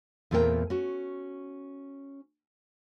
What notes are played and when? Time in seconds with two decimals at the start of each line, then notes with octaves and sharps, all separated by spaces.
0.31 E2 A#2 A3 C4 A#4 G5
0.70 C#4 F#4